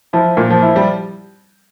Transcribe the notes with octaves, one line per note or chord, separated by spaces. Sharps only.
F3 E4
A#2
F3
E4
G3